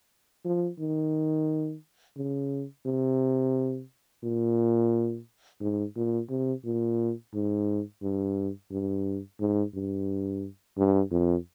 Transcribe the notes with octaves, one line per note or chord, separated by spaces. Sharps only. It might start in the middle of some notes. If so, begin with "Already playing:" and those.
F3
D#3
C#3
C3
A#2
G#2
A#2
C3
A#2
G#2
G2
G2
G#2
G2
G2
F2